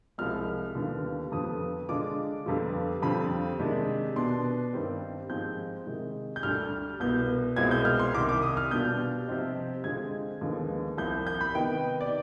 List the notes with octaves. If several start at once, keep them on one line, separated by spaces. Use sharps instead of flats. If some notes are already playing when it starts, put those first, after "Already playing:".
C2 C3 F3 G#3 F6
D#2 D3 G3 B3 F4
F2 D3 F3 B3 D#6
D3 G#3 D4 F4 D6
F2 D3 G3 B3 F4
F2 D3 G3 C4 F4 B5
C3 D#3 G#3 D4
B2 B3 D4 C6
G2 D#3 G3 C4
G#2 F3 C4 G6
C3 D#3 G#3
G6
D2 D3 G3 D4 F6
C2 B2 B3 G6
C2 B2 G#3 C4 F4 G#6
G6
F6
C6
C2 C3 D#3 D6
D6
D#6
F6
B2 G3 D4 F4 G6
C3 F3 C4 D#4
D3 G#3 C4 F4 G#6
D#2 D3 F3 G#3 B3
C2 C3 F3 G6
G6
B5
C3 D#3 B3 D#4 G5
D5